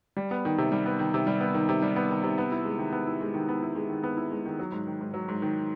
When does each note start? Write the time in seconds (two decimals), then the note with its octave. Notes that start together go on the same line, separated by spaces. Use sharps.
0.17 G3
0.31 B3
0.45 D#3
0.58 C3
0.72 G3
0.86 B3
0.99 D#3
1.14 C3
1.27 G3
1.41 B3
1.54 D#3
1.69 C3
1.82 G3
1.96 B3
2.10 D#3
2.23 C3
2.38 B3
2.52 E4
2.65 G#3
2.79 D#3
2.92 B3
3.07 E4
3.21 G#3
3.34 D#3
3.48 B3
3.63 E4
3.75 G#3
3.89 D#3
4.03 B3
4.17 E4
4.31 G#3
4.46 D#3
4.59 F#3
4.72 G#2
4.87 D#3
5.01 G#2
5.14 F#3
5.28 G#2
5.42 D#3